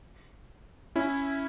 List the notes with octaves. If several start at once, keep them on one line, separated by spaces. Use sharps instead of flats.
C#4 E4